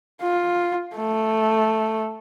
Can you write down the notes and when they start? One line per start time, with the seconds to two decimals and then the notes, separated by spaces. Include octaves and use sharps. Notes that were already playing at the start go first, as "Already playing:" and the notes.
0.21 F4
0.96 A3